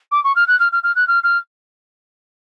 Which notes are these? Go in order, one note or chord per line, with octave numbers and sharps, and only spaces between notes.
D6
C#6
F6
F#6
F6
F6
F6
F#6
F6
F6